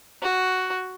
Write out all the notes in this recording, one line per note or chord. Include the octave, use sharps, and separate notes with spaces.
F#4